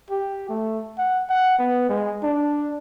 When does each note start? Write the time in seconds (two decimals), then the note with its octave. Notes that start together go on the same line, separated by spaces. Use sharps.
0.10 G4
0.49 A3
0.98 F#5
1.29 F#5
1.59 B3
1.89 G#3
2.23 D4